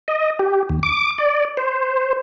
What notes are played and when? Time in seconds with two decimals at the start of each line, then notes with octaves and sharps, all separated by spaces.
0.08 D#5
0.39 G4
0.69 D#2
0.83 D6
1.18 D5
1.57 C5